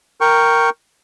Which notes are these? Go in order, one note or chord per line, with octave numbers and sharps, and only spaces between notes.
A#4 G5 C#6